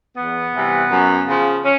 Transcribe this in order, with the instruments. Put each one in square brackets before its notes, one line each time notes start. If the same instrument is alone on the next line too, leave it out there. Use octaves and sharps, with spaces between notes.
[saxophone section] E2 B3
C3 E3 G3
F#2
C#3 F3
C#4